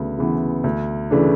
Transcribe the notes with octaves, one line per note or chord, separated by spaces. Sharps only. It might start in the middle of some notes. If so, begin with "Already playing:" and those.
Already playing: D2 C#3 E3 B3
C#3 E3 B3
D2
C#3 E3 A3 D4